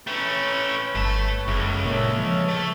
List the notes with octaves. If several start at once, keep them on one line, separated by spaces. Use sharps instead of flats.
A3 C#4 B4 C#5 G5
G1 A3 A5
F#1 C#2 A4 E5
A#2 A4 C#5 E5
F3
A3